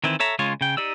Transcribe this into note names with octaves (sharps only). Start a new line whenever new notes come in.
D#3 E3 C4 E4
A4 C#5 E5 A#5
C#3 G#3 F4 C#5
C#3 G5
D#4 G4 D5 E6